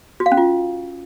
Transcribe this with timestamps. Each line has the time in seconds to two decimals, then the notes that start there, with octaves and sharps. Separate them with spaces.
0.20 F#4
0.26 F5
0.32 C#4
0.37 F4